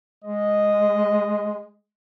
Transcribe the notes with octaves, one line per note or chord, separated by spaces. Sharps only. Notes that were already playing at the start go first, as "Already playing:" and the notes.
G#3 D#5